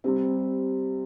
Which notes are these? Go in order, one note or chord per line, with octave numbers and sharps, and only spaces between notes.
C3 G3 C4